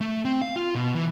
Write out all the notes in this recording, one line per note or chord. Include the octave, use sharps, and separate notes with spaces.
A3
C4
F5
F4
B2
E3